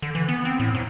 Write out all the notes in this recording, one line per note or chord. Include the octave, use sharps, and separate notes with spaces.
D3
E3
B3
C4
A2
G#2